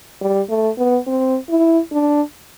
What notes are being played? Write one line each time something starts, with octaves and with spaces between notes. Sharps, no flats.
G3
A3
B3
C4
E4
D4